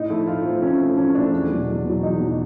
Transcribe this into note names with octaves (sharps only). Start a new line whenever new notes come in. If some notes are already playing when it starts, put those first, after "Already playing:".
Already playing: A2 D#4
F3 A3 C4 E4
A2 F4
F3 A3 C4
A2 C#4
F3 A3 C4
A2 C#4
F3 A3 C4 D4
E2
B2 F#3
E2
B2 F#3
E2 D#4
B2 F#3